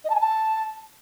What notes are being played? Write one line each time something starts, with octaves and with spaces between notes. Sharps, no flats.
D#5
A5
G#5
A5